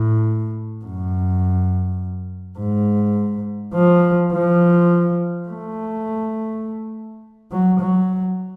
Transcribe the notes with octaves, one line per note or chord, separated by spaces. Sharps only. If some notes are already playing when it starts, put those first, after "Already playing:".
Already playing: A2
F#2
G#2
F3
F3
A3
F#3
F#3